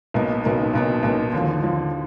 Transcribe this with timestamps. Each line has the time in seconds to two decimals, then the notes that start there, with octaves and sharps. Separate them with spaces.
0.14 B1 B2 A#3 D#4
0.44 B1 B2 A#3 D#4
0.74 B1 B2 A#3 D#4
1.03 B1 B2 A#3 D#4
1.33 D#2 D3 F3
1.63 D#2 D3 F3